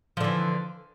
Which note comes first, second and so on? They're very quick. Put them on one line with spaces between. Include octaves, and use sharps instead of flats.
F3 D3 E3